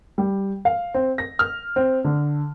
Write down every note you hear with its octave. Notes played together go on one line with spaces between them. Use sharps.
G3
F5
C4
A#6
F6
C4
D3